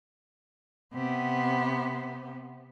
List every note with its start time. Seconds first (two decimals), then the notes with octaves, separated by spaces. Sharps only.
0.94 C3 B3